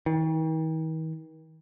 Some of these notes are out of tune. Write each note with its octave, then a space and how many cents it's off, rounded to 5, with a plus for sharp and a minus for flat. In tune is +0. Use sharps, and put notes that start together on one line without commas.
D#3 +45